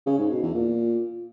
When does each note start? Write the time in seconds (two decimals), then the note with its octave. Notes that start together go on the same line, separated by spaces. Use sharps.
0.06 C#3
0.18 G#2
0.30 B2
0.42 E2
0.54 A#2